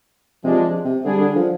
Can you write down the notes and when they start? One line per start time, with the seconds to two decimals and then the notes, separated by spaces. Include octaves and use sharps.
0.44 C3 F3 G#3 D4
0.85 C3
1.05 D3 G3 D4 G#4
1.21 D3
1.36 F3